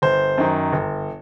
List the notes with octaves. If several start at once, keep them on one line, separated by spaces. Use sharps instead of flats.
G1 C5
F#2 D#3
G1